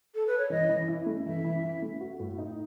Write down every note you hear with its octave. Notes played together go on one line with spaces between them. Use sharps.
A4
B4
C#5
E3 D#5
E3
E4
A3
E3 E5
E3
E4
A3
F#4
A2
D#4